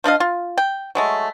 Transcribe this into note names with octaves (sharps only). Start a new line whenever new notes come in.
F3 D4 D#5 F5
F4
G5
F#3 G#3 A3